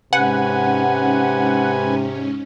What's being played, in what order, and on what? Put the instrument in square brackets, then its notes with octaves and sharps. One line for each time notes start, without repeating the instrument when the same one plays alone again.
[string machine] G#2 C#4 [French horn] C3 [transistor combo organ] B4 G#5 [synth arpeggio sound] F#5